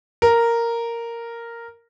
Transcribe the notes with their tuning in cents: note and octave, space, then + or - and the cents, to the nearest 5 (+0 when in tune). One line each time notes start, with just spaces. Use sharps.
A#4 -5